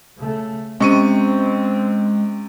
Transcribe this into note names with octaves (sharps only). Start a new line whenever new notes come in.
C#3 A3
C3 G#3 C4 C#4 C#6 D#7